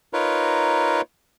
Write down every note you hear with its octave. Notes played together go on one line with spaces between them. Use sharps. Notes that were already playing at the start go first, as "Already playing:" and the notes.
D#4 F4 A#4 B4 C#5